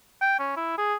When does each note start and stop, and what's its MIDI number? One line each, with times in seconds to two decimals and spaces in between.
0.22 0.36 79
0.39 0.52 61
0.57 0.74 64
0.78 0.95 68